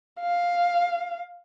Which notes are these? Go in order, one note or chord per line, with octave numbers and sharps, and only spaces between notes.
F5